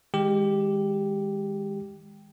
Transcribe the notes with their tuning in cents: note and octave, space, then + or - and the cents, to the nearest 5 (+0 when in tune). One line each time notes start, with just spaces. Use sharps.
D#3 +30 G#3 -20 G4 +0